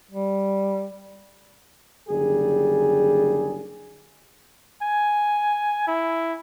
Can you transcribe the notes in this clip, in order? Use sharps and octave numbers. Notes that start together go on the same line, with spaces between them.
G3
F#1 D3 G3 G#4
G#5
E4